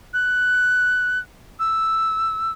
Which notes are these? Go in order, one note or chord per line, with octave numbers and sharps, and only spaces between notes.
F#6
E6